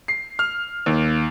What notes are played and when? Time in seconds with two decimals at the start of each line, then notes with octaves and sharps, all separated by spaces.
0.08 C7
0.39 F6
0.86 D#2